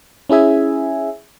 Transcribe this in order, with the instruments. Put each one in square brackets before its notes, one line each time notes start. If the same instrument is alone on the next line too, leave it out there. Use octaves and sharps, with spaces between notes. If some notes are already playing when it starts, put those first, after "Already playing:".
[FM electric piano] C#4 E4 G#4 E5 G#5